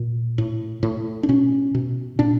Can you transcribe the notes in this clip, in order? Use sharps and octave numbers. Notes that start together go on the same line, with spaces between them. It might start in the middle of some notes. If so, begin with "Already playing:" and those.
Already playing: A#2
A2
A2
D4
B2 C#4
B2
A#2 D4